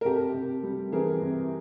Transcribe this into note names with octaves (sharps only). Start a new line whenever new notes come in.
A#4
C3 G4 A4
C3
G3
E3 G#4 A#4
C3